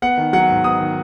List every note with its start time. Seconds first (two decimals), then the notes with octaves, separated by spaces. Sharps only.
0.02 B3 F#5
0.18 D#3
0.33 F#3 F#5
0.49 G#2
0.64 B3 D#6
0.80 D#3